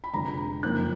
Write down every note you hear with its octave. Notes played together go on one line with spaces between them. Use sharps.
B5
F1 F2 D3 G#3 A#5
F#1 F2 F3 A#3 D#4 F#6